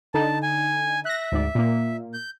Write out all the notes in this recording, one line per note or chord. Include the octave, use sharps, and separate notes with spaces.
D3 D#4 A5
G#5
E5 F#6 A#6
D2 G#2 D5
A#2 A#3
G6